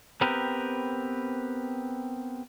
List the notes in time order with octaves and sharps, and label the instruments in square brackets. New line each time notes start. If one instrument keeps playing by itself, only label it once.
[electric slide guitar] B3 C4 G4 A#4 B4